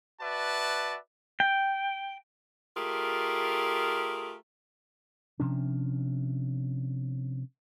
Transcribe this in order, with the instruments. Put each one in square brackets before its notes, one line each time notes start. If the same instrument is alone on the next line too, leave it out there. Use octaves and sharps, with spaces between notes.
[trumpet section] F#4 B4 D5 E5 A5
[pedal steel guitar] G5
[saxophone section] A3 F4 G4 G#4 A#4
[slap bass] C3 F3 C#4 D4